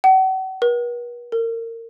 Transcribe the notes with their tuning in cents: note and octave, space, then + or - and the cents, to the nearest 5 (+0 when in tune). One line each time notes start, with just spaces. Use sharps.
F#5 +40
B4 -45
A#4 -30